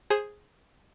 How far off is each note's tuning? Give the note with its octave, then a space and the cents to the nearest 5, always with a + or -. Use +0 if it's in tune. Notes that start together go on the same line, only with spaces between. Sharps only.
G#4 +0 C5 +20 G#5 +0